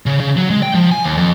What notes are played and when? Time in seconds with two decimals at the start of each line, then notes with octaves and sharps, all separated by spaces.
0.06 C#3
0.20 C#3
0.37 F#3
0.50 G#3
0.63 G5
0.75 F3
0.91 G#5
1.04 D#2
1.17 F2